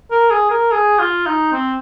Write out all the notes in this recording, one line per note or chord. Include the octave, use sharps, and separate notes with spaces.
A#4
G#4
A#4
G#4
F4
D#4
C4